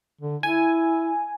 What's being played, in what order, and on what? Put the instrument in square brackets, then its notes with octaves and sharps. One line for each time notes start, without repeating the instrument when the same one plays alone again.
[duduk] D3
[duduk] E4 [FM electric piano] G#5